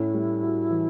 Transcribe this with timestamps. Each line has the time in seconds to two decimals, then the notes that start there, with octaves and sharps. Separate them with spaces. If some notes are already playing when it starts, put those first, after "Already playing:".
Already playing: A2 C#4 E4
0.14 G3
0.43 F#4
0.71 E3